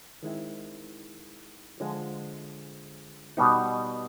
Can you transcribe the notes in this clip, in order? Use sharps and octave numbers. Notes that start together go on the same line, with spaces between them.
D#3 G#3 C4 E4
D3 F3 G#3
B2 G3 B3 D#4